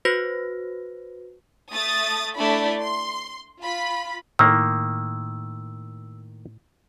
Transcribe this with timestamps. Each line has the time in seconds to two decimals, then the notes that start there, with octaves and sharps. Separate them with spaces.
0.05 F#4 B4 C5 A#6
1.72 A3 D#6 A6
2.36 A3 D4 E4 D5 B5
2.79 C6
3.61 F4 B5
4.39 A2 D#3 A#3 E6